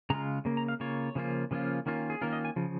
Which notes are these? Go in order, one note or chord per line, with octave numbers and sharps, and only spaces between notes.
C#3 G#3 F4 A#5
C#3 A#3
A#5
F5
C#3 A#3 F4 C#5
C#3 F3 A#3 C#4 F4
C#3 F3 A#3 C#4 F4
D#3 A#3 C#4 F4
G#4
D#3 A#3 C#4 F4 A#4
D#5
G#5
C#3 F3